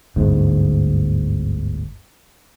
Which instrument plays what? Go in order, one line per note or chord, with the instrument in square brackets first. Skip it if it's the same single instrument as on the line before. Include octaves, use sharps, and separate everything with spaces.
[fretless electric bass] G1 D2 G#2